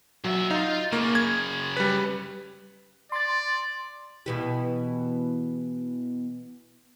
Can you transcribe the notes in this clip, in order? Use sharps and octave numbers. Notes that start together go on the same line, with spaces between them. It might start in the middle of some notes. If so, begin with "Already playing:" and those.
A#2 F#3 E5
D#4 F4 F5
F#2 C#3 A#3
G#6
G3 B4
D5 C6 A6
B2 E3 G4